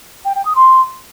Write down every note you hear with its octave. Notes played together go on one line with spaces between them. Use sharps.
G5
G5
D#6
C6